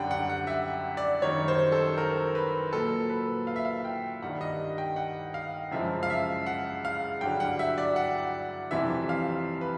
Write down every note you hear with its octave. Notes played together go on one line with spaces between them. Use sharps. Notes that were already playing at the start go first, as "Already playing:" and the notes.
Already playing: F#2 D3 G3 F#5 G5
F#5
F#5
E5
D5
F#2 D#3 G3 C#5
C5
A4
A#4
B4
A#2 F#3 A4
B4
F5
E5
F5
G5
G2 D#3 G3 F#5
D#5
G5
F#5
F5
F#2 C#3 F3 G#3 E5
F5
E5
F#5
F5
G2 D3 F#3 G5
F#5
E5
D5
F#5
F2 C3 E3 G3 E5
F5
B4